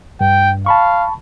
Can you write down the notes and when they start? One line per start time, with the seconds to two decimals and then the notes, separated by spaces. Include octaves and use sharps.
0.21 G2 G5
0.66 F5 A5 B5 C#6